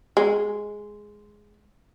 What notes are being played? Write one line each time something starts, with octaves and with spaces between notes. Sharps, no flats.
G#3